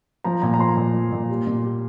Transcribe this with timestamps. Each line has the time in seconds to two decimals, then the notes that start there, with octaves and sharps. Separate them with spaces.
0.24 F3 A#5
0.42 A#2 A#5
0.54 A#5
0.59 F3 C6
0.77 A#2
0.94 F3
1.12 A#2
1.29 G3
1.47 A#2
1.63 G3